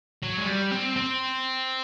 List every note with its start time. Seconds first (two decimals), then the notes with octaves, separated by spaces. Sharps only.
0.23 F#3
0.38 G#3
0.47 G3
0.71 C4
0.96 C4